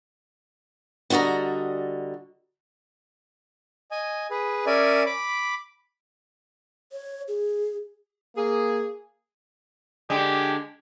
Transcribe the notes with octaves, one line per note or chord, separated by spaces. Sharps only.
D3 G3 F#4 D#5 A#5
D#5 G#5
G#4 B4
C#4 A#4 D5 E5 G#5
B5 D6
C#5
G#4
A#3 G#4
D3 G#3 G4